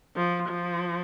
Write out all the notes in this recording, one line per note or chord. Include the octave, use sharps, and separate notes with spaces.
F3
F3